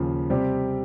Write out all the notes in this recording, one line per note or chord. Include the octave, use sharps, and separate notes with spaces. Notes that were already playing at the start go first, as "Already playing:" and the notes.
Already playing: D#2 C#3 F3
C3 G3 C4 G4